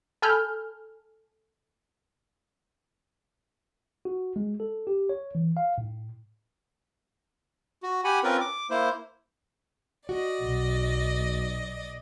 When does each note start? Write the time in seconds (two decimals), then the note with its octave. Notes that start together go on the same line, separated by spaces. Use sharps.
0.22 A4 G#5 B5 F6 G6
4.05 F#4
4.36 G#3
4.60 A4
4.87 G4
5.09 C#5
5.35 E3
5.57 F5
5.78 A2
7.83 F#4
8.04 G4 F#5 G#5 B5
8.24 C4 C#4 F4 A#4 B4
8.40 D6
8.70 A#3 E4 C5
10.09 F#4 D5 D#5
10.41 B1